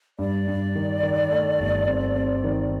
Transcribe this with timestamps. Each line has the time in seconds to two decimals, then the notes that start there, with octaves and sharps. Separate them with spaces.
0.19 G2 D5
0.47 G2
0.75 D#3
1.03 D#3
1.31 A3
1.60 G1
1.88 C4
2.16 C4
2.44 D#3